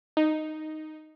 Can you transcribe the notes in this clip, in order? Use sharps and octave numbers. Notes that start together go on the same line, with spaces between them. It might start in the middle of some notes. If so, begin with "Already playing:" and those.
D#4